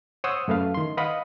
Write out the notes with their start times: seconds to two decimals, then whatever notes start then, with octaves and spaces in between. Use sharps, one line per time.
0.24 C5 C#5 F#5 C6 D#6 E6
0.48 F#2 A3 B4 F5
0.74 D#3 C6
0.97 B4 D#5 F5 F#5 B5